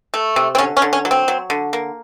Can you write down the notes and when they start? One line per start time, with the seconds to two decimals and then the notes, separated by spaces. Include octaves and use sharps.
0.14 A3
0.36 C3
0.55 C4
0.58 D3 C#4
0.77 C#4
0.82 D3
0.93 C#4
1.05 F#3
1.11 C4
1.28 F#3
1.50 D3
1.73 A#3